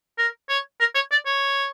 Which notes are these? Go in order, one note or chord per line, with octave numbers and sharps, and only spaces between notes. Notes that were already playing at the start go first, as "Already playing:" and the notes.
A#4
C#5
A#4
C#5
D5
C#5